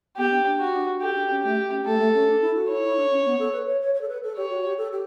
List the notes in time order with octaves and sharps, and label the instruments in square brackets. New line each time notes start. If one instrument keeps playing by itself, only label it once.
[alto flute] B3 [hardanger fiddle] G4
[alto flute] D4
D4
[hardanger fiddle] F#4
[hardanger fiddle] G4 [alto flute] A4
[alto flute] D4
C#4
[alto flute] A3 [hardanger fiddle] G4
[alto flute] C#4
[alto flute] A3 [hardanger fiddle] A4
[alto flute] A3
C#4
D4
E4
F#4
[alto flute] E4 [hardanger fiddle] C#5
[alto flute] E4
D4
C#4
B3
A4
B4
C#5
C#5
C#5
A4
B4
A4
[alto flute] G4 [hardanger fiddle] C#5
[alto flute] F#4
G4
A4
G4